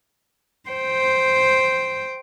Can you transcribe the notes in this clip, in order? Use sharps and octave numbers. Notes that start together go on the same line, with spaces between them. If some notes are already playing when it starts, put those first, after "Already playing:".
C5 G5